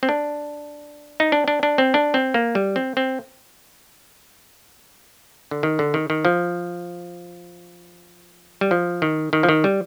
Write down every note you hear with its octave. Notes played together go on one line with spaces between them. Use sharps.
C4
D4
D#4
D4
D4
D4
C4
D4
C4
A#3
G3
C4
C4
D3
D#3
D3
D#3
D#3
F3
G3
F3
D#3
D#3
F3
D#3
G3